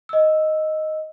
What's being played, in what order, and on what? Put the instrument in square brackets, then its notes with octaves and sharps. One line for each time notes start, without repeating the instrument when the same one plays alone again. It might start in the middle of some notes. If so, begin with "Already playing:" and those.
[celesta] D#5 E6